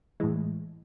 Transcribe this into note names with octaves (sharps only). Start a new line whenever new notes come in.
A2 E3 G#3